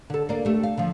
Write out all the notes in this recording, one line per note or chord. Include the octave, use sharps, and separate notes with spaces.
D3 A4
A#3 D5
A3 G4
F5
D3 F3